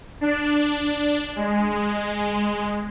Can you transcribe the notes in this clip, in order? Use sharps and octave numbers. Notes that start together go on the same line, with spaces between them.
D4
G#3